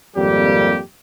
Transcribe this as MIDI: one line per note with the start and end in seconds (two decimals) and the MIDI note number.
0.16 0.78 32
0.16 0.78 41
0.16 0.78 55
0.16 0.78 58
0.16 0.78 67